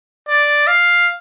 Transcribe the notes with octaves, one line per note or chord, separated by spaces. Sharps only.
D5
F5